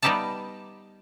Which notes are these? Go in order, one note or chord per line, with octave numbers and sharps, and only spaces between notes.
G3 B3 D#4 G4 E5 A5